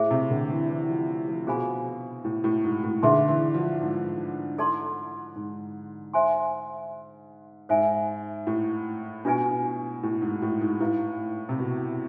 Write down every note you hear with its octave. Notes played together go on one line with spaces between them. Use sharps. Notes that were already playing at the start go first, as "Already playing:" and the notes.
Already playing: A2 G#4 C5 E5
C3
D3
E3
E3
F3
F3
B2 G#4 C5 F5 G#5 B5
A2
A2
G#2
A2
D3 G#4 B4 E5 A5 C6
E3
F3
G#2
E4 A4 D5 A5 C6
G#2
C5 E5 G#5 C6
G#2 C5 E5 G#5
A2
B2 D4 F4 B4 D5 G#5
A2
G#2
A2
G#2
A2 E4 B4 F5
C3
B2